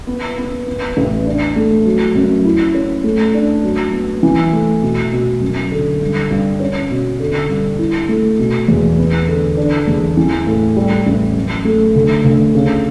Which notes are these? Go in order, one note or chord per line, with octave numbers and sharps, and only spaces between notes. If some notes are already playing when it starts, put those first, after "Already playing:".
B3
B3
B3
A1
D4
A3
F#3
F#2
E4
C#4
A3
D4
F#3
B3
E3
A3
B2
B2
F#2
D3
G2
G2
C#4
B2
D3
G2
E4
A3
B2
E2
B3
D3
D4
E2
E3
A2
G3
A1
F#2
A3
D2
D2
C#3